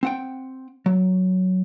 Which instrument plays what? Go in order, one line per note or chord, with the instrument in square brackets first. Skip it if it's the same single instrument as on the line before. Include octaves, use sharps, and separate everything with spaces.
[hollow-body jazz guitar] C4 F#5 G5
F#3